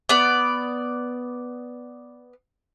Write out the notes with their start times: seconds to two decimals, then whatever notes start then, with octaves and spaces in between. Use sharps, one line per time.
0.09 B3 D5